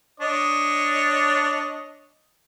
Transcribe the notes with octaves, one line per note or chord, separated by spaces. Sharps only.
D4 C#5 D#5